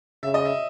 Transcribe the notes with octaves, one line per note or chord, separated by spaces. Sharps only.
C#3 E5
D#5
E5